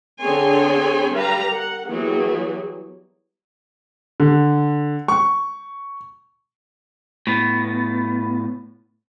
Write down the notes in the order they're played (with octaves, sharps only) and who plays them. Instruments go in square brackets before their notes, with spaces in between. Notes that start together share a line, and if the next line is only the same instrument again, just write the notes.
[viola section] D3 C4 G#4 C#5 G#5 C6
G3 G4 B4 F5 A#5
A#4 F#5
E3 F#3 G3 A#3 B3 G#4
[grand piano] D3
C#6
[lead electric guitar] A2 B3